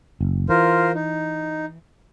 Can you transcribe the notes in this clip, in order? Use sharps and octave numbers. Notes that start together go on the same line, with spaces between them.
F#1
E3 F4 A#4 C5
D#4